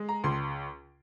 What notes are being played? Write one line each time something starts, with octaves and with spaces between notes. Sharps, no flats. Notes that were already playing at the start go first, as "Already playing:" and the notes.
Already playing: G#3
A#5
C#2 C6